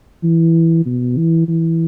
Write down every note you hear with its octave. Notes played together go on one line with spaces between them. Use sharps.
E3
B2
E3
E3